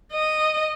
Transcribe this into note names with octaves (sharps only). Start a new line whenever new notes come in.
D#5